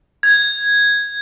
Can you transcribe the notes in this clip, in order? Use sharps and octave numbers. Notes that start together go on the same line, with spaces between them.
G#6